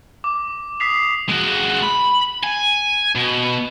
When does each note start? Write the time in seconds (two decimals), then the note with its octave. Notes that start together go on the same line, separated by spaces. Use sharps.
0.24 D6
0.80 D#6 B6 C7 F7
1.29 G#3 F#4
1.82 B5
2.44 G#5
3.16 B2